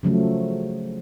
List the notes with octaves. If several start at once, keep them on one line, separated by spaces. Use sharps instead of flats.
C#3 F3 F#3 A3